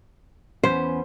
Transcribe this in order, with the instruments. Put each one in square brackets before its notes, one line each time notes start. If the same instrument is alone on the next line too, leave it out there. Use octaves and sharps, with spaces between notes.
[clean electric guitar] E2 B3 C#4 [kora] C5